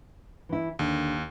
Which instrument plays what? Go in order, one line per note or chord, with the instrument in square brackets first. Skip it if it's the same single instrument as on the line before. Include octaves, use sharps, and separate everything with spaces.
[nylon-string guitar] E3 E4
[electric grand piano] D#2 [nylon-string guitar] D3